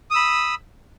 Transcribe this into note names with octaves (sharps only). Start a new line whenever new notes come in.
B5 D#6 E6